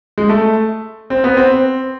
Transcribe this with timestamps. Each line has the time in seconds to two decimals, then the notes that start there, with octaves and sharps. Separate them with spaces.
0.18 G#3
0.29 A3
1.10 C4
1.24 B3
1.37 C4